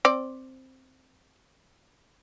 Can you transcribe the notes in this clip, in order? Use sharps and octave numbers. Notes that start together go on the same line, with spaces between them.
C4 D5